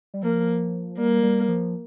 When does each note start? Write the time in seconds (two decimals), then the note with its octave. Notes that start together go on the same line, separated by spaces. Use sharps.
0.14 G3
0.23 F3 A#3
0.98 G3 A#3
1.23 G3
1.48 F3